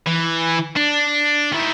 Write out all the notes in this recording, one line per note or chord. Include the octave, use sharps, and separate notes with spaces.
E3
D4
D#3 E4